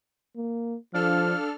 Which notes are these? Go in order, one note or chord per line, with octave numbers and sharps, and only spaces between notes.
A#3
F3 D4 A4 F5 F6